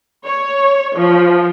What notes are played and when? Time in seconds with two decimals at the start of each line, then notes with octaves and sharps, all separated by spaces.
0.24 C#5
0.96 F3